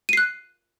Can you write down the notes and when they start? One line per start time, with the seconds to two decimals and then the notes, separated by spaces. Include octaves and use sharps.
0.09 D#7
0.13 C7
0.17 F#6